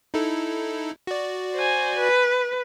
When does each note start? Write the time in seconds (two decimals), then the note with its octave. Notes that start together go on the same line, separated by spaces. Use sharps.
0.14 D#4 E4 A4
1.07 F#4 D5
1.54 C5 G#5
1.99 B4